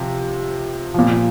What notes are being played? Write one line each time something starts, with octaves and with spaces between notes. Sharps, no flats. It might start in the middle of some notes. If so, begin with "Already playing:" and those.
Already playing: C3 F3
A#2 F3